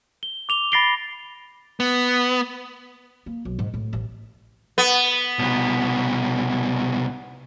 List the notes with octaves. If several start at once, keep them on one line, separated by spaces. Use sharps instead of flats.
G7
D6 F7 G7
B5 A6 A#6 C7 D7 G7
B3
A#3
B1
G#2
A2
A1
B3
C2 B2